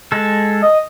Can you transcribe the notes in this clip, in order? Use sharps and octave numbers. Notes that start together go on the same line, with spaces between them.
G#3 A4
D#5